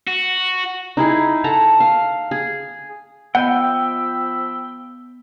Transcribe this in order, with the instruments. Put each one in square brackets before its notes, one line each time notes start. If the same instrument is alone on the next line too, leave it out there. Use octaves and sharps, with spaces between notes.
[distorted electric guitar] F#4
[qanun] D#4 E4 G#4
A4 F#5 A5 A#5
F5
G#4
[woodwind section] F3 B5 E6 [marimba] B3 D#5 [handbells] F#5 [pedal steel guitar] G5